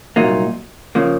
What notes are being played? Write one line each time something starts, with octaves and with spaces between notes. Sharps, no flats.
C2 A#2 F#3 A#3 D#4
C#3 F3 A#3